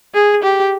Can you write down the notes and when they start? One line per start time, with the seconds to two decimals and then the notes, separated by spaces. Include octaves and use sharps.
0.14 G#4
0.43 G4